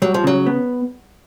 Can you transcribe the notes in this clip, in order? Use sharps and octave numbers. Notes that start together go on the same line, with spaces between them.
F#3 G3
F3
C#3 F#3
B3